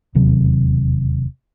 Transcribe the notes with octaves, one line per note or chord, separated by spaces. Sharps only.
E1 D#2 C3 F#3